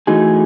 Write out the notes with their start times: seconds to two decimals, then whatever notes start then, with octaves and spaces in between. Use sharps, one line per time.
0.07 E3 A3 D#4 F#4 G#4